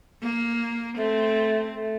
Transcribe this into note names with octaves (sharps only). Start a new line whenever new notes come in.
A#3
A3 C4
A3